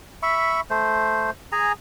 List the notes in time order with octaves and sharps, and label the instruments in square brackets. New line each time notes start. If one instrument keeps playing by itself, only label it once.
[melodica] E5 B5 C#6
A3 C5
G#4 G#5 A#5